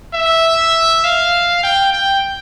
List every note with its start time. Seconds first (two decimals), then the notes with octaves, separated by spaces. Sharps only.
0.14 E5
1.04 F5
1.63 G5
1.93 G5